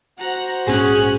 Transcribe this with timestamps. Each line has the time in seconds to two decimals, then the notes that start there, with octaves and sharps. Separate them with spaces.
0.19 F#4 C5 F#5 A#5
0.67 A#1 G#2 A#3 C#4 G#4 F#6